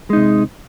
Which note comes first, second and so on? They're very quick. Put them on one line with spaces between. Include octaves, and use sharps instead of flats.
G#3 D#4 C3